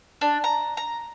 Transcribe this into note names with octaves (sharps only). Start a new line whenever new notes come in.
D4
A#5
A#5